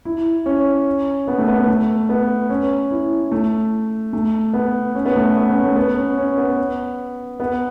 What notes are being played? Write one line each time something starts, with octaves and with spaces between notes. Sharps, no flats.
E4
C#4
B3
A3
B3
B3
A3
B3
C#4
E4
A3
A3
B3
C#4
B3
A3
B3
C#4
A3
B3
C#4
C#4
B3
B3